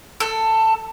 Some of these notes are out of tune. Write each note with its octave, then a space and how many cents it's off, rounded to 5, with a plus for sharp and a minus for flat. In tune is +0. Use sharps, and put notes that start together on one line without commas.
A4 +15